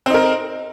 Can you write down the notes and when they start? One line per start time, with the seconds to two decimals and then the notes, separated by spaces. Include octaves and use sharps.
0.06 C4
0.10 D#4
0.14 A#4